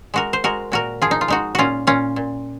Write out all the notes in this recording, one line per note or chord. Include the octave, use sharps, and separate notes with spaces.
G#3 F#4 A#4
C5
G#3 F#4 A#4
A#2 F#4 A#4
F3 F4 G#4
D#4
F4
G#3 D#4 F#4
A#2 C#4 F4 F#4
A#2 C#4 F4
A#2